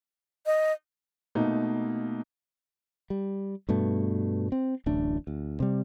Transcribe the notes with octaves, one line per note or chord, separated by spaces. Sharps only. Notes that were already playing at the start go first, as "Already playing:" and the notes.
D#5
B2 A3 A#3 D#4
G3
G2 B2 A3
C4
D1 A1 A3 D4
D2
C3 G3